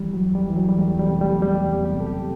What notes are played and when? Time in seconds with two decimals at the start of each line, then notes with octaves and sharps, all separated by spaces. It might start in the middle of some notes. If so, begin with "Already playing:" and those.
Already playing: E3 G3
0.13 F#3
0.20 E2
0.35 G3
0.49 E3
0.56 F#3
0.69 G3
0.78 E2 A3
0.99 G3
1.06 C3
1.21 G3
1.35 E2
1.42 G3
1.64 E2
1.85 G4
1.92 C3
2.00 A4
2.07 G4